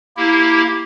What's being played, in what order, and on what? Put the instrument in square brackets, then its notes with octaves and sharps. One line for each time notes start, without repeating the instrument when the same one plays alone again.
[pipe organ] A#3 E4 G4